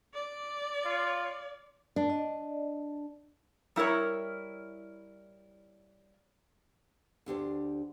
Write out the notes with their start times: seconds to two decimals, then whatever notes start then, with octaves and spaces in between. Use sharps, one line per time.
0.14 D5
0.85 F4
1.96 D4
2.10 D5 D#5
3.76 G3 E4 A#4 C#5
7.26 D2 D4 G4 C5